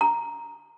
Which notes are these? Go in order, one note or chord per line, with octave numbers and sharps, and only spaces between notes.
A#5